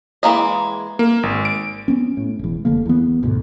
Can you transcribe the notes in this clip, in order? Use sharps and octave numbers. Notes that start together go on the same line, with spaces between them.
E3 G#3 A#3 D#5
A#3
G#1
D7
B3 C#4
A2
E1 E2
F1 D3 A#3
E2 B3
D2 G#2 B2